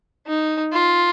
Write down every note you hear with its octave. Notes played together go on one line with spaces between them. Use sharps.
D#4
F4